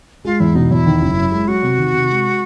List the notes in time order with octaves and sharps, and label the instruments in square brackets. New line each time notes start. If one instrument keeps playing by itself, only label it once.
[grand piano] G#3 [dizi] F4
[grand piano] E2 [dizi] E4
[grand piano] B2 [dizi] D#4
[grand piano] E2 [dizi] E4
[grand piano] D#3
F#1
F#2
G#3
[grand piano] F#3 [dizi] F#4
[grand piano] C3
D#3
C3
G#3